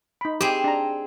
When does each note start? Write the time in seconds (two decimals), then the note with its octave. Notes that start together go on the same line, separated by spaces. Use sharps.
0.21 D#4 B5
0.41 C4 G4 G#4
0.64 D4 A#5